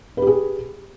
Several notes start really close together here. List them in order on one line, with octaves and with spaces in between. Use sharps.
B4 G4 G#4